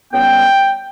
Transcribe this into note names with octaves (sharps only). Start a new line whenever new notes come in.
C#2 C#3 G3 B3 G5